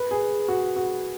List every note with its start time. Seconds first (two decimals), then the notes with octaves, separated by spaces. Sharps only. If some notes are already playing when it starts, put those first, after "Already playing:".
Already playing: B4
0.11 G#4
0.48 F#4
0.76 F#4